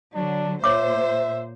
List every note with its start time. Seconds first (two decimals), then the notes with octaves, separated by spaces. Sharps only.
0.15 D3 F#3 D4
0.64 A#2 C5 C#5 E5 D6